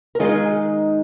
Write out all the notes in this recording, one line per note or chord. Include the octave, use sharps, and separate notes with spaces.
A#4
D#3 G#3 D#4 F4 G#4